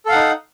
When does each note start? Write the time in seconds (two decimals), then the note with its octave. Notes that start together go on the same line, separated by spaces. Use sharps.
0.06 A4
0.09 F5
0.12 F#5
0.15 D#4